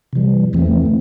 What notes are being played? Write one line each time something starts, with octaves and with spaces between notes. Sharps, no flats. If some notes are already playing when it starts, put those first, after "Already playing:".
C3 E3 G3
E2 E3 A3 C4